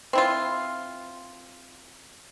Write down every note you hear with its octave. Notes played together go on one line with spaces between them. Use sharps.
C4 E4 F4